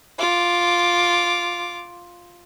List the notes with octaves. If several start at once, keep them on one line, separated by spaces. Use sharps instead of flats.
F4 D6